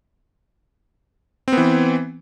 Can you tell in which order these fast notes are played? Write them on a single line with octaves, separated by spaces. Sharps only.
C4 B3 E3